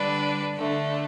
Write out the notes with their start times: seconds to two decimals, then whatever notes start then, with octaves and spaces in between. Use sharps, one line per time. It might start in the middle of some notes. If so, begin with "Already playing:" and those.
Already playing: D3 G3 D4 B4 D5
0.56 D3 A3 D4